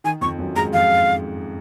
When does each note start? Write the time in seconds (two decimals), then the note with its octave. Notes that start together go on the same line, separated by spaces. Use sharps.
0.04 D#3 G#5
0.21 F2 F3 C#6
0.39 F#2 F#3
0.56 G#2 G#3 A#5
0.73 F2 F3 F5